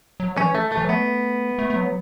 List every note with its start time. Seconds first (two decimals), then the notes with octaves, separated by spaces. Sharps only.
0.20 F#3
0.37 E3 C#4
0.55 A3
0.72 A3
0.77 E3
0.84 F#3
0.89 A3 B3
1.59 A3
1.70 A3
1.76 F#3